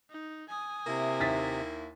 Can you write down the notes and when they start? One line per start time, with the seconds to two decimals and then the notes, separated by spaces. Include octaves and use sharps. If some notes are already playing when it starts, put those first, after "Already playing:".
0.10 D#4
0.49 G#5 D#6
0.87 C3 A#3 E4
1.20 D#2 A6 B6